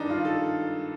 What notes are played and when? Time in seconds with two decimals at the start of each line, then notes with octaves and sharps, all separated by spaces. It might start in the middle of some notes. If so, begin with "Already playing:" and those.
Already playing: G2 D#3 D4 D#4
0.10 F4
0.25 A4